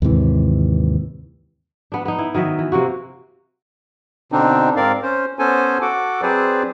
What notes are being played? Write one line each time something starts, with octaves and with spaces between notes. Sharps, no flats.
D#2 G#2 C3 E3
B3 D4
B3 D#4
E4
D#3 F#3 D#5 E5
E3
C3 A#3 F#4
B2 D3 C4 D4 D#4
G#2 C4 A#4 D5 F5
C#4 C5
B3 C#4 A4 C5 G#5
F#4 A4 F#5 D6
F#3 C4 G#4 B4 C5 D5